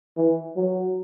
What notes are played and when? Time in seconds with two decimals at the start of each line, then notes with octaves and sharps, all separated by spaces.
0.17 E3
0.56 F#3